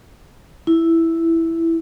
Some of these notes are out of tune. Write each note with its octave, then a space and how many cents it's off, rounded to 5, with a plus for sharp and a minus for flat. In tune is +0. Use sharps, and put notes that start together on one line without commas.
E4 +0